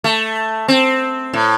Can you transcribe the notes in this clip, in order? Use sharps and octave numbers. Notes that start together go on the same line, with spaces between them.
A3
C4
A2